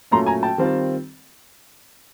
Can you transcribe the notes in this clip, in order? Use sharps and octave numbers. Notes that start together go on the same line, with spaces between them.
A#2 F#3 A3 C#4 A#5 C6
G#5 A#5
G5 A5
D#3 G3 C4 F4